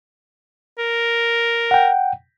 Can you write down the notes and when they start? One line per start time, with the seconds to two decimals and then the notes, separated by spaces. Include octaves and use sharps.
0.78 A#4
1.71 F#5 G5